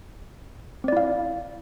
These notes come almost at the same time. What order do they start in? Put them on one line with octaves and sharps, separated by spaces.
C4 D5 E4 F5